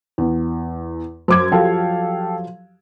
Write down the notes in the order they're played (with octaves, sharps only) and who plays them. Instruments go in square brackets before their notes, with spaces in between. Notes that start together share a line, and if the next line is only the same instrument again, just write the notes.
[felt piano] E2
[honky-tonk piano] F#2 G#6 [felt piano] C5 D6
[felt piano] F3 F#3 [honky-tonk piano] G4 A4 F5